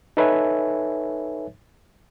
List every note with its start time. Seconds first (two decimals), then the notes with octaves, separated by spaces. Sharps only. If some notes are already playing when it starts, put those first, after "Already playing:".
0.17 D#4 A4 B4 C#5 E5 G#5